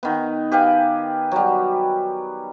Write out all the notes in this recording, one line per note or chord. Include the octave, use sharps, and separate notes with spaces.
D#3 B3
G4 B4 F5 G#5
F#3 G3